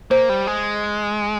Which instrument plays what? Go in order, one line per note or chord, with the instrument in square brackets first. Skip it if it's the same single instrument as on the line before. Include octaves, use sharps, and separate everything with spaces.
[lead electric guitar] A#3 [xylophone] C5
[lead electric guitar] G3
G#3